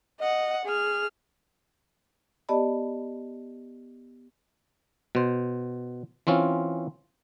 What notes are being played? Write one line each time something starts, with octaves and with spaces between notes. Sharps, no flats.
D#5 F#5
G#4 F6
B3 G4 D5 D#5 A5 B5
B2 C5
E3 C4 C#4 F4